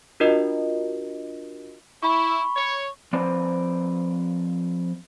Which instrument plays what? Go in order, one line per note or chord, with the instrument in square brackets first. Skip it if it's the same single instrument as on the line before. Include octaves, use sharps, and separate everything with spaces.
[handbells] D4 F4 F#4 A#4 D#5
[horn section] E4 [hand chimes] B5 C#6
[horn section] C#5
[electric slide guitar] F3 C4 B4 C5 D5